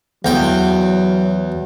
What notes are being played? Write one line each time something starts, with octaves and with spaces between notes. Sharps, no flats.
E2 F#3 G5